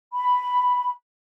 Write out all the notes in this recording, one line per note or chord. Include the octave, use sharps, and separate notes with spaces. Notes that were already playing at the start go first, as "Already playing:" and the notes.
B5